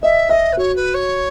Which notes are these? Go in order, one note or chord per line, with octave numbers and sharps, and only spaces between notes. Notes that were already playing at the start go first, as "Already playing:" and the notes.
D#5 E5
D#5 E5
B4
F#4 C#5
B4
C#5